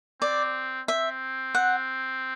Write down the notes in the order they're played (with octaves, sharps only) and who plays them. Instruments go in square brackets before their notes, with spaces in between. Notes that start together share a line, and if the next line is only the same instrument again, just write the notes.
[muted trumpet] C4 [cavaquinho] D5
[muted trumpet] C4 [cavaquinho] E5
[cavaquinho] F#5